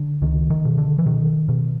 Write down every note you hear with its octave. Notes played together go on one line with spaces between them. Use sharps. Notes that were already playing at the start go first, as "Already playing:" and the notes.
Already playing: D3
C#2 D#3
D#3
B2
D3
E3
B2 D#3
B2